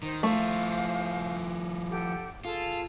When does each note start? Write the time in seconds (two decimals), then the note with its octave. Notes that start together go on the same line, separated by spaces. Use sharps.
0.03 D#3 C5
0.23 F3 A3 E4 C5 F5
1.90 G4 A4 F#5
2.45 F4 G#4 A4 A5